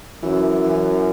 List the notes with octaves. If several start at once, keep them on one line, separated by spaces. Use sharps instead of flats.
F#2 E3
E3